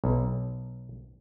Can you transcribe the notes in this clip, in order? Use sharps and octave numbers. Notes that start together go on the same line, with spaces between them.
B1